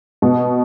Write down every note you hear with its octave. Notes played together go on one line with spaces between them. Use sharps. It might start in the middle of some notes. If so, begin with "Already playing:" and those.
B2